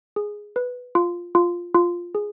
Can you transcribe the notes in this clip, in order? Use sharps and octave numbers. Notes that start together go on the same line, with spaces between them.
G#4
B4
F4
F4
F4
G#4